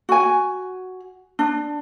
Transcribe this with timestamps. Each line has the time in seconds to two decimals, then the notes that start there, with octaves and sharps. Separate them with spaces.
0.09 F#4 G#5
1.39 D4